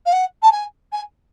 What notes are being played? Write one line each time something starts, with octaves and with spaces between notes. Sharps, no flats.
F5
F#5
A5
G#5
G#5